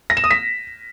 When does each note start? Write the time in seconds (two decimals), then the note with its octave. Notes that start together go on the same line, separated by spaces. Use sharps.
0.10 A#6
0.17 E7
0.24 D#6
0.31 B6